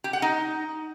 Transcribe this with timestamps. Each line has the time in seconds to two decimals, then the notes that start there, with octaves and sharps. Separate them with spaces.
0.04 G4
0.13 F#5
0.22 D#4